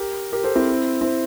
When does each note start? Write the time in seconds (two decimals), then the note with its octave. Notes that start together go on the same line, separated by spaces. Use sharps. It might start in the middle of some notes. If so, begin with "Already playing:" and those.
Already playing: G4 A#4
0.32 G4 A#4
0.44 A4 C5
0.55 C4 E4
1.01 C4 E4